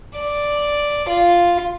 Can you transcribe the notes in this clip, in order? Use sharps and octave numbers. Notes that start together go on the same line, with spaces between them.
D5
F4